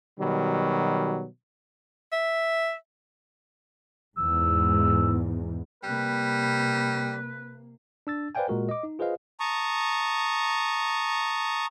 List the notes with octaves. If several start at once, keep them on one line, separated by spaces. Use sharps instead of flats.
B2 D#3 F#3 G3
E5
E2 G#2 E6
C3 G3 A#3 B4
D4 E6 A6
B4 C5 D5 F5 G5 G#5
A#2 G#3 F#4 A#4
D#5 D6
D#4
F4 G#4 B4 C5 D#5 F5
A5 A#5 C#6 D#6